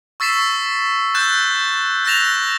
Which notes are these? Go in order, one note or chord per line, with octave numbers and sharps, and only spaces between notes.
C#6 E6 A6 B6 C7 E7
E6 F#6 G6 A6 E7
E6 F#6 A6 A#6 E7 F7